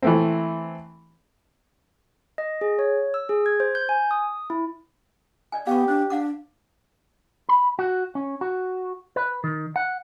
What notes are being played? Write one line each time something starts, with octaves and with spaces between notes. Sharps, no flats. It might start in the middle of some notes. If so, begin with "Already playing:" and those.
E3 A3 C4
D#5
G#4
C#5
E6
G#4
G#6
C5
G6
G#5
D#6
E4
D5 D#5 G#5
B3 G4 F5 C#6
D4 C5
D4 F5 F#5 D6
B5
F#4
C#4
F#4
B4
D#3
F#5